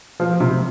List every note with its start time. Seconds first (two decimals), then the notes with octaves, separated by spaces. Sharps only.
0.20 F3
0.40 C3